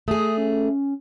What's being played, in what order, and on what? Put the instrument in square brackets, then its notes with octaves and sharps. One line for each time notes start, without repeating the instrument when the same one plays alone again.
[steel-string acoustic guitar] A3 G#4 [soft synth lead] D#6
[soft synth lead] C#4